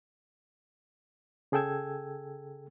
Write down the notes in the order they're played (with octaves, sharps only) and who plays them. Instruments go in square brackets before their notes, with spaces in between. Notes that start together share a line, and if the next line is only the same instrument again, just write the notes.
[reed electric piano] C#3 G#4 A4 G5 E6 G#6